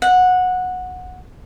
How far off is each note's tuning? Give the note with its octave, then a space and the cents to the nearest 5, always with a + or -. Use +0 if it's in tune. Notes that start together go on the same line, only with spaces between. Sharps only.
F#5 -15